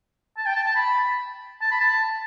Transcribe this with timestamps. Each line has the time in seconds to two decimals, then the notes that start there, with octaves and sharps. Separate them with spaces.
0.38 A5
0.46 G5
0.56 A5
0.66 A5
0.75 B5
1.61 A5
1.71 B5
1.81 A5